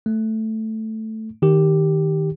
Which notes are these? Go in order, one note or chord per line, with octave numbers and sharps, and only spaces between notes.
A3
D#3 G4